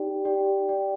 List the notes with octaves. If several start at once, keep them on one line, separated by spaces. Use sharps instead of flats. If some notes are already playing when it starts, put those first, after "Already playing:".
Already playing: D#4 G4 D5 G5
D#4 G4 D5 G5
D#4 G4 D5 G5